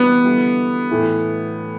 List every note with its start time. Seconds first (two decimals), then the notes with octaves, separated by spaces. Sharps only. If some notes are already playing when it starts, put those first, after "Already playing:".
Already playing: E3 G3 B3 D4 G4
0.25 D3 G3 E4
0.91 A2 E3 A3 E4